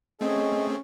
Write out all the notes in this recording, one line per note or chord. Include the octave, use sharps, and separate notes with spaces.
A3 C4 C#4 G#4 D#5